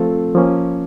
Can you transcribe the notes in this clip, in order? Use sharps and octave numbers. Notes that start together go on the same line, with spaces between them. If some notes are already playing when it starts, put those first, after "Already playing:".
Already playing: F3 A3 C4 F4 A4
F3 A#3 C#4